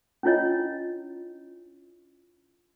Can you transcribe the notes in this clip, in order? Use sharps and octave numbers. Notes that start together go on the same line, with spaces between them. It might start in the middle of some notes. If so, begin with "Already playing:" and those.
C#4 D4 E4 F4 C#5 D#5